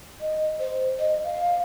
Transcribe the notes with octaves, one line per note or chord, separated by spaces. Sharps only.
D#5
C5
D#5
F5